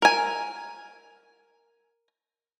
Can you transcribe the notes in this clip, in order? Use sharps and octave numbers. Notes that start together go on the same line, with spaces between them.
A#4 G#5